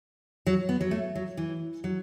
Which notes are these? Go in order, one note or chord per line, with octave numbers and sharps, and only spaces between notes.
F#3
B3
F#3
A3
F#3
E3
F#3